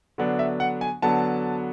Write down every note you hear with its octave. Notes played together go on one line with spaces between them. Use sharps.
D3 F#3 B3 D4
E5
F#5
G#5
D3 F#3 B3 D4 A5